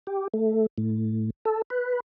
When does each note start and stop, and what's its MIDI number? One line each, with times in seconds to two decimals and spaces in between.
0.07 0.28 67
0.34 0.66 57
0.78 1.30 45
1.45 1.62 69
1.70 2.00 71